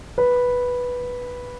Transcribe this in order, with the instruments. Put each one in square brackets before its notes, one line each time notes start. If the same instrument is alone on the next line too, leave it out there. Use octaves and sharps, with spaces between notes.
[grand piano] B4